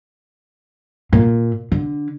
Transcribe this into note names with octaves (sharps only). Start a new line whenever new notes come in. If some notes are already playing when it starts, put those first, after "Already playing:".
A#2
D3